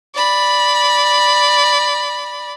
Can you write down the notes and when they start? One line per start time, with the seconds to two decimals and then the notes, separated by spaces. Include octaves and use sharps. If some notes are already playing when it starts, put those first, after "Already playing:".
0.15 D5 B5